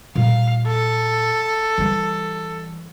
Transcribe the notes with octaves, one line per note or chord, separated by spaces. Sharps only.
A#2 G3 F5
A4
E3 G3